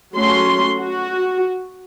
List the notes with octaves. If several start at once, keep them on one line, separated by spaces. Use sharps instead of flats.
F#3 A3 C#4 C6
F#4